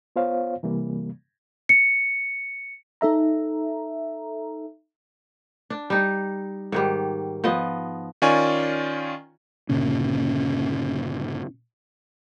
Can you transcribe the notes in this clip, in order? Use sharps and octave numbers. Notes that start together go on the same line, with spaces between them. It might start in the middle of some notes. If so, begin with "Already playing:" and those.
B3 F4 C5 C#5 F5
C3 E3 G3 A#3
C#7
D#4 A4 E5 A#5
D4
G3 D#4
G#2 D#3 G3
F3 B3 D#5
D#3 C#4 F4 D5 G#5 C#6
G1 A#2 C#3 C#4